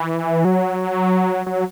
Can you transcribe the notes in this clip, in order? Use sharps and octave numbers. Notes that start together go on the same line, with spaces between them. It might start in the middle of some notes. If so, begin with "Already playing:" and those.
Already playing: E3
F#3
F#3